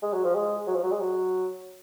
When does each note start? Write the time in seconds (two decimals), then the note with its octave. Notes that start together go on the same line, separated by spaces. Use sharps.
0.02 G#3
0.13 F#3
0.24 F3
0.35 G#3
0.67 F#3
0.75 F3
0.83 F#3
0.91 G#3
1.00 F#3